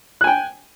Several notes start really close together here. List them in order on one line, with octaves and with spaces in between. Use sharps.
F#6 G#5 G5